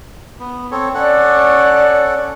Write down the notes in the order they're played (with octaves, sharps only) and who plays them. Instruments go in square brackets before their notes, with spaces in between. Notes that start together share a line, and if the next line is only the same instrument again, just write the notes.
[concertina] B3
C4 A4 C#5
[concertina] C#4 A4 F#5 [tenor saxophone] D5